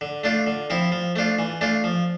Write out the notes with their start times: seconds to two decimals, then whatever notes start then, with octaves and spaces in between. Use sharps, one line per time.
0.01 D3
0.24 A3 D4 F4
0.47 D3
0.70 F3 C4 E4
0.92 F3
1.16 A3 D4 F4
1.39 E3
1.61 A3 D4 F4
1.84 F3